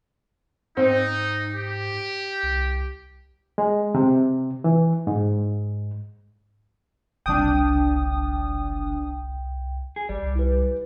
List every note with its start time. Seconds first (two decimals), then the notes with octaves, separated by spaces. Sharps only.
0.77 G#2 C4 D#4
1.54 G4
2.43 C2
3.58 G#3
3.95 C3
4.64 E3
5.07 G#2
7.26 F#1 C2 D4 G5 D#6
9.96 G#4
10.09 G#1 G3 D5
10.22 C2
10.35 E4 B4